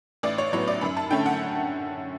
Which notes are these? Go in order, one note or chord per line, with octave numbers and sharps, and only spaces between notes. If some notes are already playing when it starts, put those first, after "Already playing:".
A1 D5
C#5
A2 F#3 B3 C#5
D5
F#2 B5
A5
D3 A3 C#4 G5
F#5